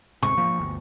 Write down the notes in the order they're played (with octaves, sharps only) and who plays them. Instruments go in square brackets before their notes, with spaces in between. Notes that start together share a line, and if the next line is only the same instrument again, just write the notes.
[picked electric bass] D#1 G#2 C3 [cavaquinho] C#6
[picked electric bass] F3 A#3
G1 D2